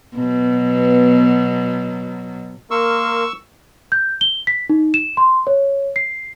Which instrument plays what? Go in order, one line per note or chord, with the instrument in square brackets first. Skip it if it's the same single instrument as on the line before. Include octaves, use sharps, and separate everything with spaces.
[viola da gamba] B2 F#3 [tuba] B3
[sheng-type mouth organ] A#3 A#4 C6 [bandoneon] C#6 E6
[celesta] G6
G7
B6
D#4
E7
C6
C#5
C7